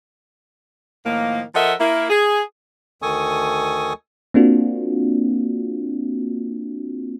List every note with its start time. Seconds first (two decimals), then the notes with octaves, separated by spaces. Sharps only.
1.05 A2 D#3 F3 A#3
1.55 F3 A4 A#4 D#5 E5 F#5
1.80 A#3 E4
2.10 G#4
3.02 D2 D#3 A4 G#5 C#6 D#6
4.34 A#3 C4 D4 F4 F#4